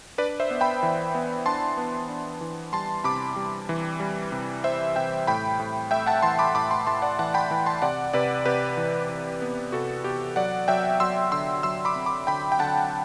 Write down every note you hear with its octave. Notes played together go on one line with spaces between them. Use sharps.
D4 B4 D5
C5 E5
B3
G5 B5
E3
B3
D4 A5 C6
B3
D4
E3
G3 A5 C6
C3 B5 D6
G3
E3
G3
C3
C3 C5 E5
C3 E5 G5
A2 G5 B5
A2
A3 E5 G5
F#5 A5
E3 A5 C6
B5 D6
A2 B5 D6
A5 C6
A2 A5 C6
D5 F#5
E3 F#5 A5
G5 B5
E3
A5 C6
C3 D5 F#5
C3 B4 D5
C3 G4 B4
E3
E3
B3
C3 F#4 A4
B3 G4
F#3 D5 F#5
F#3 E5 G5
F#3 C6 E6
D3 C6 E6
F#3 C6 E6
B5 D6
C4
B5 D6
D3 G5 B5
G5
D3 F#5 A5